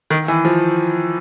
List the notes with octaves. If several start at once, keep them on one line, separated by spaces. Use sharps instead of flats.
D#3
E3
F3